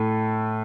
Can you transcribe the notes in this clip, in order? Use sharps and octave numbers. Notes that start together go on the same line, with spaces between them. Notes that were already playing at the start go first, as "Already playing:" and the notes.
Already playing: A2 A3